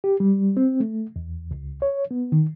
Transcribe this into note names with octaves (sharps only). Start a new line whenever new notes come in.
G4
G3
C4
A3
E2
C#2
C#5
B3
D#3